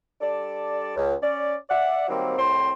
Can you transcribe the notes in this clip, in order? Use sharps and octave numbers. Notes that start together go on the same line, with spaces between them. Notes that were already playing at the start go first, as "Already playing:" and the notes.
G3 D4 A4 D5
C#2
C#4 D5
D5 E5 F#5
D#3 F#3 G3 A#3 C4
C2 A2 C4 C5 C6